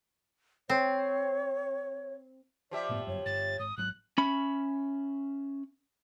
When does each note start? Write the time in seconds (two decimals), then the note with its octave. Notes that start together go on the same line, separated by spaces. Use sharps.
0.69 C4 C#5
2.71 F3 G4 D5 E5
2.89 G1 A2 B3
3.07 G1 F#2 C#5
3.26 G1 A6
3.59 G#1 D#6
3.78 G#1 F#3 F#6
4.18 C#4 E5 B5